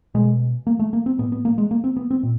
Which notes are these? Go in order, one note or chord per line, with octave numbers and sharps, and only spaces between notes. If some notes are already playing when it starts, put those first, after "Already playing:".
B2 G#3
A#3
A3
A#3
C4
A2 B3
B3
A#3
G#3
A#3
C4
B3
C4
A#2